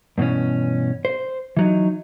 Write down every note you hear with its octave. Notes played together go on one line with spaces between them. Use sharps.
G2 B2 E3 C#4
C5
E3 F#3 D#4